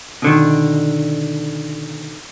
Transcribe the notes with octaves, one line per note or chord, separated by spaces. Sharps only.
B2 D3 D#3